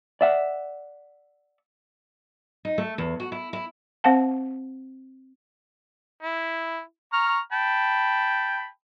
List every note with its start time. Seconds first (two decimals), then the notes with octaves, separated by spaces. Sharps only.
0.21 D5 E5 F#5
2.65 D#4
2.78 A3
2.98 E2
3.20 F#4
3.32 E4
3.53 E4
4.04 C4 C5 F5 F#5 A5
6.23 E4
7.13 A#5 C#6 F6
7.52 G5 A5 B5